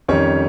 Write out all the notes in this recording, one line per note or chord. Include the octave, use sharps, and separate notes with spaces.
F2 D#3 G3 C#4 C#5